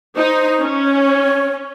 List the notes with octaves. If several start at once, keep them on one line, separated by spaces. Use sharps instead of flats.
D#4 C5
C#4
C#5